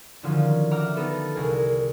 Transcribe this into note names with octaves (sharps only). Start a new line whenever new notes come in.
D3 D#3 F3 F#3 C#4
E5 F#5 A#5 D6 E6 F6
B3 D#4 A4 B4
C2 G#4 A#4